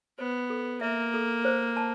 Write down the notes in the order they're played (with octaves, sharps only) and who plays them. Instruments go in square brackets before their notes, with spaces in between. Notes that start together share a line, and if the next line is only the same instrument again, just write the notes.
[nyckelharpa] B3 [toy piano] C5
[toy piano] A4
[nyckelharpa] A#3 [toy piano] E5
[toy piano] A4
C5
A5